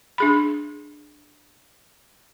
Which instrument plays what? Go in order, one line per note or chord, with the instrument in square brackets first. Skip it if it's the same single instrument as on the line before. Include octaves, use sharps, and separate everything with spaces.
[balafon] D4 G#4 B5